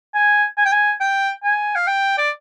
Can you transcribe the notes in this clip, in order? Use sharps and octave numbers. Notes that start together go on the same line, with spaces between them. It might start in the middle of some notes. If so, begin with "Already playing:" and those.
G#5
G#5
G5
G#5
G5
G#5
F5
G5
D5